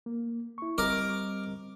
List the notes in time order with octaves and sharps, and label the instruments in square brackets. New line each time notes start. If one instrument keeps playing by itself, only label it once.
[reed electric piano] A#3
E4 C#6
[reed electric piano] G3 C4 D#5 [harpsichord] A#4 D6